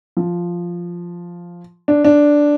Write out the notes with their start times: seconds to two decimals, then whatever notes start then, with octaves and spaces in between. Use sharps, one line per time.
0.17 F3
1.88 D4
2.05 D4